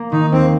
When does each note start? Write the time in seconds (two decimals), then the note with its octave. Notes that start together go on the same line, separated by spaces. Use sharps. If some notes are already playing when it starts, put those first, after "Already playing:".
Already playing: A#3
0.12 D#3 D#4
0.32 D#2 C4